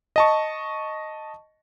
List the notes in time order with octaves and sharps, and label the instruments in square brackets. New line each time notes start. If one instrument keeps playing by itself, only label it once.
[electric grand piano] D#5 A5 C#6